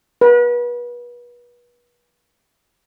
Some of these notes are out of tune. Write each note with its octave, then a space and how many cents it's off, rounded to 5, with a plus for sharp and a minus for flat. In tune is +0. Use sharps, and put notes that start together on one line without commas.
B4 -35